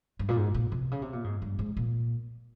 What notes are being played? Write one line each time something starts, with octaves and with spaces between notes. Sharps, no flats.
G2
A#2
G#2
A#2
C3
C#3
C3
A#2
G#2
G2
G#2
A#2